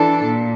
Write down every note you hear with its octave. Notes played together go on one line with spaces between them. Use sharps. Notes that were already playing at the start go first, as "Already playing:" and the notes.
Already playing: E3 D4 A4 A5
A#2